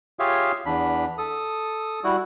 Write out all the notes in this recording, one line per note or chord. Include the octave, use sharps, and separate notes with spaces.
F4 G4 G#4 C#5 E5 F5
E2 D4 B5
A4 D#6
G3 E4 F#4